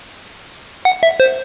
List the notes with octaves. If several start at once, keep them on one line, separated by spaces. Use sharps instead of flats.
F#5
E5
C5